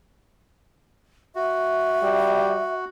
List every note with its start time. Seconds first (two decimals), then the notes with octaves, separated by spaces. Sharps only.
1.36 F#4 E5
2.03 G3